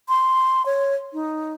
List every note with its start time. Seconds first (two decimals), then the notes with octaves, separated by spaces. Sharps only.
0.09 C6
0.66 C#5
1.13 D#4